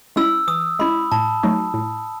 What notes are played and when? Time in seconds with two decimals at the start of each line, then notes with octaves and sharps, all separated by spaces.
0.16 G#3 C#4 E4 E6
0.48 E3 D#6
0.79 G#3 C#4 E4 B5
1.12 A2 A5
1.43 F#3 A3 D#4 F#4
1.74 A2